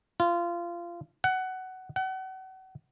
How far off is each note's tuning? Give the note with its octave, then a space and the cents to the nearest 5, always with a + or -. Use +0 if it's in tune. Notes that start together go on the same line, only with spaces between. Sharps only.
F4 -20
F#5 +15
F#5 +35